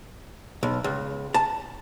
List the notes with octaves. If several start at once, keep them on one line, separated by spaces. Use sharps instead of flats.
B1
C#2
A5